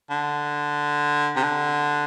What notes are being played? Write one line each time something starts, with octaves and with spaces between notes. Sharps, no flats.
D3
C3
D3